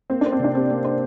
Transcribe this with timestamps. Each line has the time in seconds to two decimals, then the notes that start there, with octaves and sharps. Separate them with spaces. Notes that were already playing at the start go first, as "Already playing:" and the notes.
0.10 A#3 C4
0.21 D4 C5
0.32 C4
0.40 C3 D4
0.55 C4 G4
0.70 A#3
0.84 C5